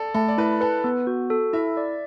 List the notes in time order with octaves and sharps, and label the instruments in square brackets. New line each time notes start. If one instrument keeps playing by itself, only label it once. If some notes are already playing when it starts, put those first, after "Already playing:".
Already playing: [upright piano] A4 D5
[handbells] A3 [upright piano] A4
[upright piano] D5
[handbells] E4 [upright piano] B4
[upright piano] A4 [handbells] B4
[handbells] B3
F#4
A4
[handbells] E4 [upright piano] E5
[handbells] D5